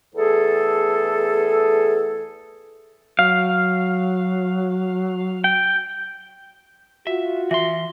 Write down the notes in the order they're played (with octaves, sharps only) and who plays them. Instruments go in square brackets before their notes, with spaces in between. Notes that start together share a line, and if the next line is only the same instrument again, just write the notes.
[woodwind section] E2 A3 G#4 A4
[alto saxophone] F#3 [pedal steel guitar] F5
[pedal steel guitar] G5
[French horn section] F4 F#4 [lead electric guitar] E5
[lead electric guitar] E3 C6 [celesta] E5